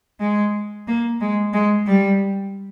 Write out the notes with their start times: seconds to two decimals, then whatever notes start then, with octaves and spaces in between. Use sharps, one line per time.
0.20 G#3
0.88 A#3
1.21 G#3
1.54 G#3
1.86 G3